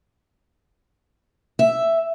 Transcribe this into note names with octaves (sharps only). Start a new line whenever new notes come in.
E5